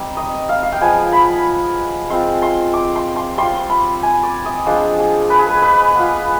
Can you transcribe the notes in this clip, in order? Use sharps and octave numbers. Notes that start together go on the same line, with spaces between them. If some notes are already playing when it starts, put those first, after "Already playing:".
Already playing: G3 C4 D#4
D#5
F5
F5
G5
F3 G#3 B3 G#5
B5
G#3 C4 F4 C6
C6
D6
C6
C6
G3 C4 F4 C6
B5
G#5
D5
D#5
F3 G#3 D4 F4 C5
G#4
B4
G#4
B4
B4
B3 F4